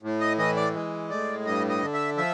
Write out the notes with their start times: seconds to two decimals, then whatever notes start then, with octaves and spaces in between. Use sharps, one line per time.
0.03 A2
0.20 D#5
0.38 E3 D#5
0.56 D5
0.74 G#3
1.10 A2 D5
1.46 G2 D#5
1.69 D#5
1.82 D3
1.93 E5
2.17 F3 E5